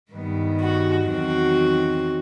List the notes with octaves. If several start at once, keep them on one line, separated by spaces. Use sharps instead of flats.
G2 D#3 G3 B3
F#4
E2 D#3 F#3 C4 F#4